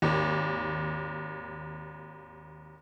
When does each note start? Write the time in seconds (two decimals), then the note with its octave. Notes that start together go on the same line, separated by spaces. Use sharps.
0.02 G#1 D#2